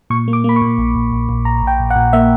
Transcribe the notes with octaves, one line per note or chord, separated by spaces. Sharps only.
A#2 C#6
A#3
D6
A#3 B5
C#6
A#2
A#1
A#1
A#1
A#1
A#1 A#5
A#1 G5
A#1
F#5
A#2
A#3 E5